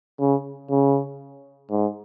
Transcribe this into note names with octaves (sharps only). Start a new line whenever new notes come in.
C#3
C#3
G#2